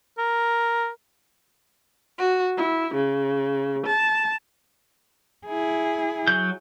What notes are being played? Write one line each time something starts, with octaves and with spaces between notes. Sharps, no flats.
A#4
F#4
E4
C#3
A5
E4 G#4
F#3 G6